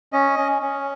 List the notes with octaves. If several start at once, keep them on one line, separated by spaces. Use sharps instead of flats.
C#4 D#5
C#4
C#4